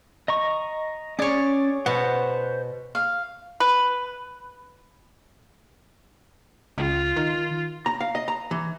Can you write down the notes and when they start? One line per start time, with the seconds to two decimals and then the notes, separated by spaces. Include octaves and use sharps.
0.28 D#5 A#5 C#6
1.19 C#4 G#4 C#5 D5
1.86 B2 C5 F#5
2.95 F5
3.60 B4
6.78 C#2 F4
7.16 D#3
7.86 A#5
8.00 F5
8.15 D#5
8.28 A#5
8.51 E3